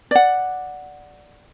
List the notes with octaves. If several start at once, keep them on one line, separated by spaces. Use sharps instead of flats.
D5 F#5